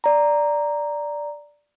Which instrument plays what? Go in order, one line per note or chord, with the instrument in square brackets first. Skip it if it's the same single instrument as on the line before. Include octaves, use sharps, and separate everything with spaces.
[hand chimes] D5 A#5